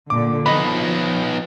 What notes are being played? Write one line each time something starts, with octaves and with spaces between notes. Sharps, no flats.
A#2 D3 D6
F3 B3 D#4 D#5 B5